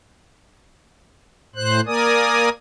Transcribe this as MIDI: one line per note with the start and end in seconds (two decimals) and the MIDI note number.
1.56 1.81 45
1.56 1.81 72
1.56 1.81 90
1.86 2.49 58
1.86 2.49 70
1.86 2.49 74
1.86 2.49 80
1.86 2.49 87